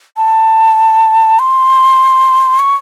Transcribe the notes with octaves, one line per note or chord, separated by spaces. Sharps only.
A5
C6
C#6